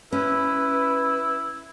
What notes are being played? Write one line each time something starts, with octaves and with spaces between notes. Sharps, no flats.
C#4 E4 B4